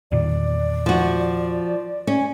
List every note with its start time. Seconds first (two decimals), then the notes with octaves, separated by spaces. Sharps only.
0.12 E2 A#2 D#3 D5
0.86 F3 F#4
2.07 C#4